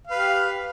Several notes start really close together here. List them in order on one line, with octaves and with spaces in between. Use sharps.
F5 B4 G4